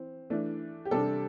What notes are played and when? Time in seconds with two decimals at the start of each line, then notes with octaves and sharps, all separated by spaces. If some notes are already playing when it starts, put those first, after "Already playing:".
Already playing: E3 C4
0.30 E3 A3 D4
0.85 G4
0.91 C3 G3 D4 A4